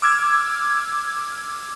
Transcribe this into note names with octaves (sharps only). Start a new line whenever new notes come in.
D6 E6 F6 G#6